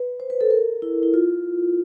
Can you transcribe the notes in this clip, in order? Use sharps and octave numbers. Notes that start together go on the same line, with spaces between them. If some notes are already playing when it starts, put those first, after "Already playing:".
Already playing: B4
C5
B4
A4
A#4
E4
E4
F4